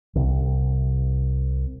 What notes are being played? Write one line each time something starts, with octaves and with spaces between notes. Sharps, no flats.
C2 C3